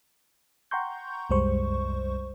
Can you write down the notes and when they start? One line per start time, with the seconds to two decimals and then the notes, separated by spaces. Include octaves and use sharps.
0.71 F#5 G5 A#5 C6 C#6 G6
1.30 C2 F#2 G3 G#3 C5 C#6